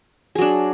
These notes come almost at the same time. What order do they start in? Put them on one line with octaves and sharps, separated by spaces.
G#4 F#3 D4